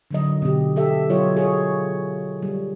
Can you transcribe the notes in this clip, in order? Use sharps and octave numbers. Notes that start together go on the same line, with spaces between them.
D3 F#3 D#5
B2 D3 G4
G4 A4 E5
F#3 F4 C#5 D#5
G#4 C#5
G3